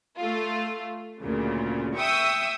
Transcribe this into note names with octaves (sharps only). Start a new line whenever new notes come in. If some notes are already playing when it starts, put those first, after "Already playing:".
A3 F4
D2 A#2 C#3
E5 G5 C#6 D#6 E6